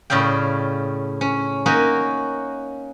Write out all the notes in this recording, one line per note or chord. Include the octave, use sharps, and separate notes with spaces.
A2 C#3 D5 F5 G5
C#4
A#3 C#4 D#4 F#4